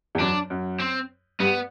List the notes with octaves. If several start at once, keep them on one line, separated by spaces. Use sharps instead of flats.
E2
F#2 D4
F#2
C4
G2 B3